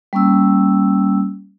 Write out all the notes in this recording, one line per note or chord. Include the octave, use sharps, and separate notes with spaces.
G3 A#3 C#4 E6